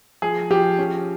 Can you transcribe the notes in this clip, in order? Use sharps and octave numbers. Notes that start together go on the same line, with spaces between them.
F3 G#4
F3 G4
C#4